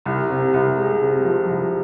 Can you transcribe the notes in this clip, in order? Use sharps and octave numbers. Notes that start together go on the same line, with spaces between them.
C2
C3
C2
G#3
C3
F3
C2